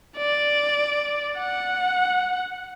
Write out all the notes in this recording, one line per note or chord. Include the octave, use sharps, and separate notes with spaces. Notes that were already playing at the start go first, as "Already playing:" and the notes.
D5
F#5